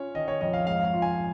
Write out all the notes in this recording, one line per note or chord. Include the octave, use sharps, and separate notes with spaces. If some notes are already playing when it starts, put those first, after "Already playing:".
Already playing: C#4 F4 C#5
D#3 D#5
C#5
F2 D#5
F5
G#2 F5
F5
F4
G#5